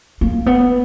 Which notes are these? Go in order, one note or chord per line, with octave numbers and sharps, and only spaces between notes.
A#3
B3